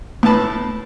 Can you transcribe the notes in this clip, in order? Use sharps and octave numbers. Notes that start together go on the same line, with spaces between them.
A2 B3 A5 B5